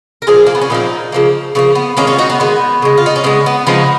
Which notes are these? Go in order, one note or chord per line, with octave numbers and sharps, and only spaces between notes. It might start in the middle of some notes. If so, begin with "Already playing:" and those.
A#4
A#2 F3 A#3 F4 G#4
A#3
B3
C#4
A#2 F3 A#3 B3 D#4
C#3 F3 A#3
C#3 F3 A#3 B3
B3
D#3 G#3 A#3 C#4
C#4 F4
D#4 F#4
B3
D#3 G#3 B3
C#3 G#3
F4
D#4
C#4
C#3 G#3 B3
B3
C#3 F3 G#3 B3 D#4